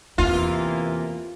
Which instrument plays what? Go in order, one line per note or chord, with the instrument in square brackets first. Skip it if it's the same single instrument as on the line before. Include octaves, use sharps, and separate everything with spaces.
[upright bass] E2 C4 [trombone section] C3 E3 A#3 [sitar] F4